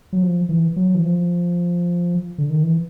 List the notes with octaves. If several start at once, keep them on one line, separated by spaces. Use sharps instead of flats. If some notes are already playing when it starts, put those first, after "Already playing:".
F#3
F3
E3
F#3
E3
F3
D3
D#3
E3